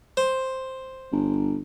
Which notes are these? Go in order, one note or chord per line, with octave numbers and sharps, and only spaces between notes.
C5
G1